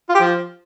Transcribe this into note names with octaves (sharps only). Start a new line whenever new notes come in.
F4
G4
F3